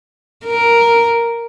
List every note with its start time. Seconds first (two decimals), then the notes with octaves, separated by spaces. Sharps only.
0.45 A#4